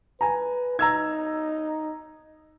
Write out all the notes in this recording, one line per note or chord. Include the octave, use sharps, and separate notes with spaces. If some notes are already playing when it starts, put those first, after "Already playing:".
B4 G#5 A#5
D#4 A#5 E6 G#6